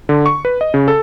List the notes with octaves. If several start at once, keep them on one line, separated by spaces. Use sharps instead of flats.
D3
C#6
B4
D#5
C#3
A4